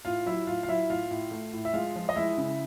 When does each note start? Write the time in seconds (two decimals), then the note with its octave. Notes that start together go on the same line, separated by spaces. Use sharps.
0.05 A2 F4 F5
0.26 F#3 E4 E5
0.47 A2 F4 F5
0.63 F5
0.68 F#3 E4 E5
0.90 A2 F4 F5
1.11 A2
1.31 A3
1.53 A2
1.65 E5
1.73 G#3 F4 F5
1.96 F3
2.09 D#5
2.16 G#3 E4 E5
2.38 C#3